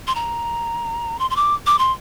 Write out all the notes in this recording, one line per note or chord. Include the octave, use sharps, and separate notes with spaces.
C6
A#5
C6
C6
D6
D6
C6